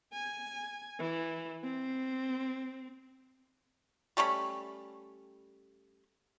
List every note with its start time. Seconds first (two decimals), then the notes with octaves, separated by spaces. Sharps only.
0.13 G#5
0.99 E3
1.64 C4
4.17 G3 A3 C#4 B5